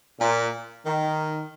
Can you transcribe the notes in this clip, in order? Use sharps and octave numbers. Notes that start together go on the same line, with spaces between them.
A#2
D#3